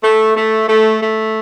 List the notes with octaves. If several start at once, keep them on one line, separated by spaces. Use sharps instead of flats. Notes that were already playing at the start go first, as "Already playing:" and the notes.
A3
A3
A3
A3